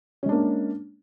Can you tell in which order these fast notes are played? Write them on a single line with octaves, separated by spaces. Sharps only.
C#4 G#3 D4 A#3